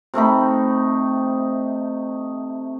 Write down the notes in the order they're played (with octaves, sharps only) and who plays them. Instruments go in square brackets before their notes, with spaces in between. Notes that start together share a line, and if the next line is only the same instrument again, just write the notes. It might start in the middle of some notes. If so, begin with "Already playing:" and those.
[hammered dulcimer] C3 A3 D#4 B5